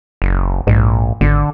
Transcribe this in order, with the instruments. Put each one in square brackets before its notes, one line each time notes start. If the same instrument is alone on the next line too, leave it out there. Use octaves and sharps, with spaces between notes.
[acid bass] F#1
[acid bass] A#1 [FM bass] G#2
[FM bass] G#1 [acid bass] D3